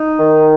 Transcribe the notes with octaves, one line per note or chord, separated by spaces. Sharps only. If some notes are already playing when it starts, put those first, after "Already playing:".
Already playing: D#4
D#3